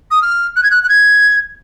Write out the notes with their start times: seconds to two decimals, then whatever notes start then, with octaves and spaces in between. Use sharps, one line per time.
0.11 D#6
0.22 F6
0.56 F#6
0.64 G#6
0.71 F#6
0.84 F#6
0.89 G#6